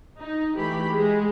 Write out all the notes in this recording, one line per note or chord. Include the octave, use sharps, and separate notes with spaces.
D#4
E3 A3 G4 B5
G#3